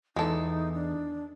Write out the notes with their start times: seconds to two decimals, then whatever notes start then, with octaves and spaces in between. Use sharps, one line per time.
0.16 E2 E3 G#3 D#4 A4
0.74 D4